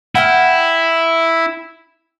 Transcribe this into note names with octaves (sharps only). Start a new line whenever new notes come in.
E4 F#5 G5 F6